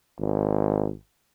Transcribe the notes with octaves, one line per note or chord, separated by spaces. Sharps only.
G#1